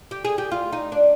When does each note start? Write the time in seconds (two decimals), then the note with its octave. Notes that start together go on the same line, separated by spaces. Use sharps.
0.11 G4
0.25 G#4
0.38 G4
0.52 F4
0.73 D#4
0.92 D4